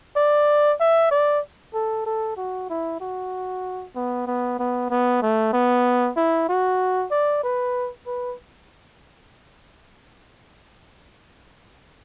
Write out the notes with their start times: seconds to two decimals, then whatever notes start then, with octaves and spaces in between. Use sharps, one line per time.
0.16 D5
0.80 E5
1.11 D5
1.74 A4
2.06 A4
2.37 F#4
2.70 E4
3.01 F#4
3.96 B3
4.27 B3
4.59 B3
4.90 B3
5.22 A3
5.53 B3
6.17 E4
6.49 F#4
7.11 D5
7.43 B4
8.07 B4